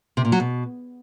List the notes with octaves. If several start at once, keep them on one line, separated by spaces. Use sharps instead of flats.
C3
A#2
F#3
B2